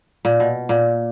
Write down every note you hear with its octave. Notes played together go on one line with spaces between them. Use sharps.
A#2
B2
A#2